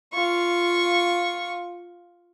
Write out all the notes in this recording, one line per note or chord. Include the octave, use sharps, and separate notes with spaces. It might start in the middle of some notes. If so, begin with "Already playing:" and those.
F4 C#6